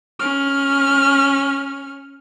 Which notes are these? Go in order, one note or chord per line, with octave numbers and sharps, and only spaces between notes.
C#4 F6